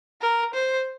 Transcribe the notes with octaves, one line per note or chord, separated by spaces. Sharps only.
A#4
C5